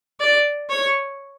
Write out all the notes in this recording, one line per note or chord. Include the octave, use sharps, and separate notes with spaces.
D5
C#5